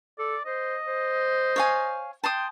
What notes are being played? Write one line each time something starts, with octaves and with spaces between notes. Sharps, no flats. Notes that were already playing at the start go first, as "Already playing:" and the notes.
A4 D5
C5 D#5
C5
C#5 F5 G#5
G5 A5 C6 D#6